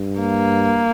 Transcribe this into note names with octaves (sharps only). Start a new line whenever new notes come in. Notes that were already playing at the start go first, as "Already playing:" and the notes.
Already playing: G2
A#3